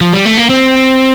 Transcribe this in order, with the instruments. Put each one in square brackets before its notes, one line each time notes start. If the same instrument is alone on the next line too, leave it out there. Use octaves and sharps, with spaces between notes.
[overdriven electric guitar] F3
G3
A3
A#3
C4